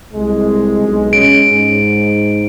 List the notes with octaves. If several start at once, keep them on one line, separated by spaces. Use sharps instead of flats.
C2 G#3
B1
C#4 D7
G#2